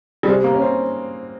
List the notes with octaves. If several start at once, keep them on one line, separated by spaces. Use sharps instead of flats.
G3
C3 G#3
A#3
C#4
C4